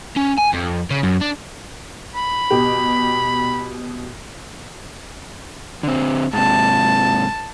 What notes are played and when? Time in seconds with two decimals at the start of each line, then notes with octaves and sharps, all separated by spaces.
0.17 C#4
0.38 G#5
0.54 F2
0.90 C#3
1.03 F#2
1.21 D4
2.15 B5
2.50 B2 G4
5.83 D3 C4
6.33 G#2 C3 A5